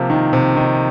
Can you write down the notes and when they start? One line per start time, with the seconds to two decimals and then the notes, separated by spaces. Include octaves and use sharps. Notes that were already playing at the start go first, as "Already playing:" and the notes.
Already playing: C3 F3 A#3
0.10 D#3
0.33 C3
0.56 D#3